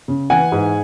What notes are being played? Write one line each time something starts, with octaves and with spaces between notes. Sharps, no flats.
C#3
E3 F#5 G#5
G#2